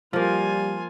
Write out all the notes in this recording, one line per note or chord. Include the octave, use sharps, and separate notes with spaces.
F3 G3 A#3 F4 G#5